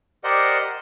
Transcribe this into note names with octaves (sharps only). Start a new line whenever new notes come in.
G4 A#4 C5 D5 D#5 F#5